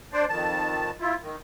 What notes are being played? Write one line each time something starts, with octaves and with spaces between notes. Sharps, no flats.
D4 C5 D5
F2 D#3 A5
E4 F4
D#3